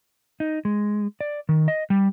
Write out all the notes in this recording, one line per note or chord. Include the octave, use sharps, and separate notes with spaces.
D#4
G#3
D5
D#3
D#5
G3